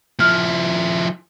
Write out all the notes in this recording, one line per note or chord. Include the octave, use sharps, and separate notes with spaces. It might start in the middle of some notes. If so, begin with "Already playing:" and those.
F3 E4 F6